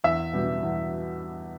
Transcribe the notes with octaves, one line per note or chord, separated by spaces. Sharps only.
E2 E5
B2 G3
E2